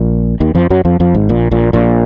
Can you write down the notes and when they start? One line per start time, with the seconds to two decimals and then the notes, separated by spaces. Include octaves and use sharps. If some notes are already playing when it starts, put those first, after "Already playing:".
Already playing: A#1 A#2
0.40 D#2 D#3
0.55 F2 F3
0.70 F#2 F#3
0.85 F2 F3
1.00 F2 F3
1.14 G#1 G#2
1.29 A#1 A#2
1.51 A#1 A#2
1.73 A#1 A#2